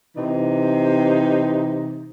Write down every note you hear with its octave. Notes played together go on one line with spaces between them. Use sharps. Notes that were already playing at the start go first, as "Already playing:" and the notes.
C3 E3 D#4